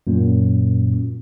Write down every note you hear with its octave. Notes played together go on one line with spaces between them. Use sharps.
F#2 A#2 A#3